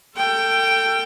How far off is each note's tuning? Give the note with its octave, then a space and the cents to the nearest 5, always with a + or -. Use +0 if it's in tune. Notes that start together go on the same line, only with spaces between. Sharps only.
A4 +35 G5 +0